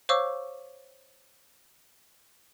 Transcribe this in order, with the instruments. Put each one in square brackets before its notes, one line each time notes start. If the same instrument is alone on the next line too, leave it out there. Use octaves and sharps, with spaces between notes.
[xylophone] C5 C#5 F5 C#6 D6 E6